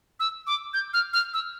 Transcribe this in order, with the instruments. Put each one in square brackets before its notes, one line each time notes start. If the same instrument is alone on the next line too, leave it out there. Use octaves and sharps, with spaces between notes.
[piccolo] E6
D6
G6
F6
F6
E6